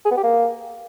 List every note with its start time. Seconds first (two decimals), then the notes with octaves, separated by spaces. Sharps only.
0.05 G#4
0.11 B3
0.17 G4
0.23 A#3